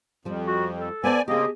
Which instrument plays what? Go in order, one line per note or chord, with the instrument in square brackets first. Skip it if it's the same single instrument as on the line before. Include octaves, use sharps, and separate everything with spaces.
[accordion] F2 [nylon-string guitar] F3 G3
[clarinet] F#4
A4
[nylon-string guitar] B3 C5 A5 [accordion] D5 G#5
[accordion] C#3 A#3 C4 [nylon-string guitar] G4 G#4 [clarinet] D#5